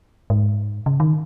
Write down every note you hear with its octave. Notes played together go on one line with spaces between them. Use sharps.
G#2
C#3
D#3